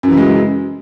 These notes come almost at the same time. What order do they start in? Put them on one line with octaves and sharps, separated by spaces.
F#2 E3 C#3 G#3 F#3